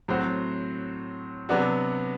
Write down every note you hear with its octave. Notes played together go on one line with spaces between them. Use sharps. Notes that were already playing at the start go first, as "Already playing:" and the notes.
A2 F#3 C4 F#4 C5
C3 F#3 B3 D4 F#4